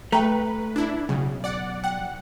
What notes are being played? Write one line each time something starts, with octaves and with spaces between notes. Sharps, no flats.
A3 B4 G5 A#5
D4 E4
B1 C#3
D5 F#5
F#5 G5